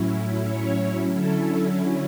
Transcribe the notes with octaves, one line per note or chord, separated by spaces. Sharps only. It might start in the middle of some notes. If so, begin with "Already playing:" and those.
Already playing: A2 F#3 C#4 E4
C#5
D3 F#3 C#4 E4 A4